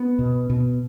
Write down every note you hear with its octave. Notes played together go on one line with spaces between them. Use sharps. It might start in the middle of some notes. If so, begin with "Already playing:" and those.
Already playing: B3
B2
B2